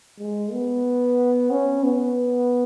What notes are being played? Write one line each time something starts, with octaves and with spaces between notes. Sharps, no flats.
G#3
B3
C#4
B3